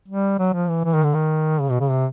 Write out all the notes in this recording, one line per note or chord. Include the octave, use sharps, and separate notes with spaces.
G3
F#3
F3
E3
E3
D#3
D3
D#3
C#3
B2
C#3
C3